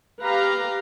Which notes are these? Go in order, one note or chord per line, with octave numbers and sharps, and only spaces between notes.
G4 B4 F5 A#5